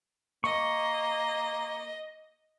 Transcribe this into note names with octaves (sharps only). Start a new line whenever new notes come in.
A#3 D#5 C#6